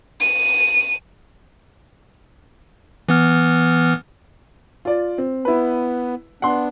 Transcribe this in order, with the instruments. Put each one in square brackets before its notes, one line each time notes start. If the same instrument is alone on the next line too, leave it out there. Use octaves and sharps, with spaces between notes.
[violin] D#7
[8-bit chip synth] E3 B3 F6
[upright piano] F4 D5
C4
[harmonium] B3 [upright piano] E4 B4
[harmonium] B3 D4 [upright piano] F#5 C6